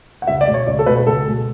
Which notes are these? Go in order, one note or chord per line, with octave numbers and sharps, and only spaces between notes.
F#5
C#2 E5
D5
B2 G#3
C#5
C#2 D5
A4
B2 G#3 B4
B4
C#2 A4
B2 G#3